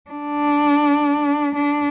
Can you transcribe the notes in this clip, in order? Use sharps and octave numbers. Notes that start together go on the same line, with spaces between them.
D4
D4